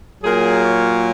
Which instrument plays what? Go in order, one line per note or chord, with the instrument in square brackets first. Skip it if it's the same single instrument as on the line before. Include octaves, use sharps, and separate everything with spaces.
[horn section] A#2 F#3 A#3 G#4
C#5